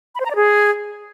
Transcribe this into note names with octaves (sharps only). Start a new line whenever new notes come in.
B5
C5
A#5
D5
G#4